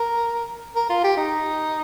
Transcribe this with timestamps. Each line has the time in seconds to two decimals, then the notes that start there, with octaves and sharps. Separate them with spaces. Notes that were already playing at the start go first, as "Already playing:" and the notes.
Already playing: A#4
0.76 A#4
0.90 F4
1.04 G4
1.18 D#4